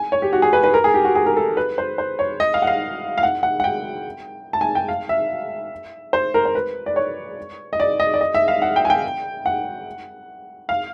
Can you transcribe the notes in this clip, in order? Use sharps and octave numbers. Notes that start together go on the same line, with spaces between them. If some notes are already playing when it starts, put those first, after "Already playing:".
Already playing: G#5
C#5
G4
F#4
G#4
B4
B4
A#4
G#4
G4
F#4
G#4
A#4
A4
B4
C5
C5
C#5
D#5
F5
F#5
F5
F5
F#5
F#5
F#5
G5
A5
G#5
G5
F5
E5
C5
A#4
C5
B4
D5
C#5
D#5
D5
D#5
D5
D#5
E5
F5
F#5
G5
G#5
G5
F#5
F5